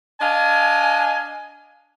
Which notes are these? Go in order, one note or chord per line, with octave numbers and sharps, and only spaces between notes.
D4 D#5 F5 G#5